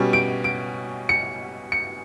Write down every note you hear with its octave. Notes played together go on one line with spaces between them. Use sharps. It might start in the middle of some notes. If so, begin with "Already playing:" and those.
Already playing: B2 G3 C#4
D7
D7
C#7
C#7